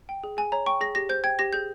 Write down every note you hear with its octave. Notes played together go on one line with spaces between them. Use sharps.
G5
G#4
G#4 G#5
C#5 A#5
G5 C#6
G#4 A#6
G4 A#6
C5 G6
G5 G#6
G4 A#6
G#4 G6